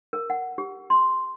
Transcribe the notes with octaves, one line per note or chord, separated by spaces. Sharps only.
A#4
F#5
G4
C6